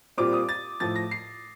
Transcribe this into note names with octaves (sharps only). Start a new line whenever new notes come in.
A#2 G3 C4 F4 D6
D#6
A6
A2 F3 A3 A6
A#6
C7